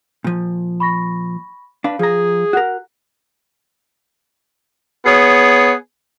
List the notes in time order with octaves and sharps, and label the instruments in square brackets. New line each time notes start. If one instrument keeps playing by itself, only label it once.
[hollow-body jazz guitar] A#2 F3
[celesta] B5 C#6 A#6
[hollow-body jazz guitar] D4 B4 [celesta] F5
[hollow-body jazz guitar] F3 A#5 [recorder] G#4
[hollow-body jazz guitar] F#4 A#4 [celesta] F#5 F#6
[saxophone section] B3 G#4 C#5